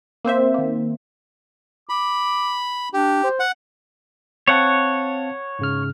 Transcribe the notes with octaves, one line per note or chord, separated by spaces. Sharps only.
A#3 C4 C5 E5
D#3 A#3
B5 D6
D4 G4
C5
F#5
C4 C#5 F5 F#5 A5
G#2 C#3 F6